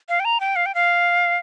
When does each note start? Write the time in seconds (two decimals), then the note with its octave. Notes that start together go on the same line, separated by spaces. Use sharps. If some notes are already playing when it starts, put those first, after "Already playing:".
0.09 F5
0.20 G5
0.25 A#5
0.40 G5
0.56 F5
0.66 G5
0.75 F5